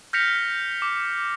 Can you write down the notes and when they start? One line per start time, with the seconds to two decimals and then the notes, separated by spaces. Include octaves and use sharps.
0.13 F6 G6 A#6 B6 C#7 F7
0.82 D6